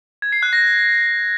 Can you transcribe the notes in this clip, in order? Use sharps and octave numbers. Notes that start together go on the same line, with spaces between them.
G#6
C7
F#6
A#6